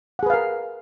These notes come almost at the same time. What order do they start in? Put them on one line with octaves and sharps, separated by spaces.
F#5 G#4 B4 F5 A#4